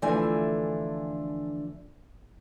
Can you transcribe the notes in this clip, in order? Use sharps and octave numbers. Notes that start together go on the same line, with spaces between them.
D3 E3 F3 A3 D4 G#5